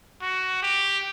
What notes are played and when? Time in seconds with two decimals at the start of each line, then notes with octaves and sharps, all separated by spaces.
0.22 F#4
0.63 G4